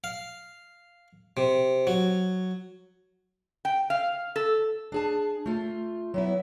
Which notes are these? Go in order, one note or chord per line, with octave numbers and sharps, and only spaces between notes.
F5
C3
F#3
G5
F5
A4
D4 G#4 A5
A3 F4
F#3 B3 E4